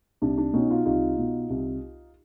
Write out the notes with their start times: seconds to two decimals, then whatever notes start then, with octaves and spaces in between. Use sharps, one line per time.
0.22 C2 D4
0.38 D4
0.53 B2 C#4 D#4
0.69 D#4 F4
0.85 C2 D#4 F4
1.18 B2
1.50 C2